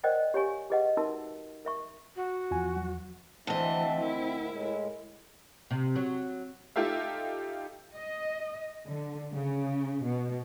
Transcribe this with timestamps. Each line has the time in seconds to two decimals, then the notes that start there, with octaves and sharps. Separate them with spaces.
0.04 A#4 C5 D5 D#5 F#5 G5
0.34 G4 C#5 F5 G#5 C#6
0.70 G4 G#4 B4 D#5 F5 F#5
0.97 D#4 F#4 A#4 E5 A5 E6
1.65 A#4 E5 C#6
2.16 F#4
2.51 E2 F3 F4 G#5
2.76 F#3
3.47 D2 E3 C4 D#5 E5 A5
4.01 E4 A#4
4.50 A2 G#3
5.71 C3
5.96 F#3
6.76 D#4 F4 G4 A4 E5 F5
7.94 D#5
8.88 D3
9.34 C#3
10.04 B2